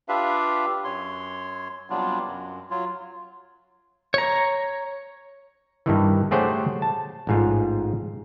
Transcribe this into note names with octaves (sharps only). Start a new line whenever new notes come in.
D4 F4 G4 B4 E5 F5
F#2 C#5 C6
C3 F#3 G3 B3 D4 F4
F#2
F#3 F4
C#5 A#5
G2 D#3 E3
A3 G4 G#4 C5 C#5 F#5
A5
A1 G#2 F4